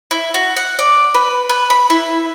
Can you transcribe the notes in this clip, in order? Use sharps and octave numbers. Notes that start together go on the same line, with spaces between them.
E4
F#4
F#5
D5
B4
B4
B5
E4